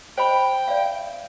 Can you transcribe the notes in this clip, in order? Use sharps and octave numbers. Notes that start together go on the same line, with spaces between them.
C5 D#5 G5 B5
D5 E5 F5